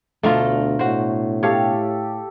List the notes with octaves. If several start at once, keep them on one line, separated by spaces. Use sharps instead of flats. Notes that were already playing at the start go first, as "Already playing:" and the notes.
D2 B2 A3 D4 F4 A#5
A2 F#4 C5
G4 A4 C#5 F5